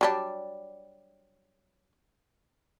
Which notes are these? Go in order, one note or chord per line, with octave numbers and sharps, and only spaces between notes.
F#3 G3 D4